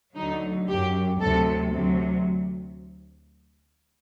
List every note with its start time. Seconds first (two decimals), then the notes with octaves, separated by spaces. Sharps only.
0.15 D2 D3 F#3 D#4
0.68 F#2 F#3 G4
1.20 D2 C3 F#3 A4
1.73 D2 C3 F#3